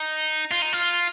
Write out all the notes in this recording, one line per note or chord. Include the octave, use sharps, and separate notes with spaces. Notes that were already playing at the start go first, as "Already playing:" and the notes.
Already playing: D#4
F4
D#4
F4